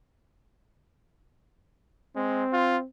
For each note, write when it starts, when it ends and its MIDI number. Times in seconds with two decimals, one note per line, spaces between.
2.16 2.44 56
2.16 2.84 60
2.53 2.77 65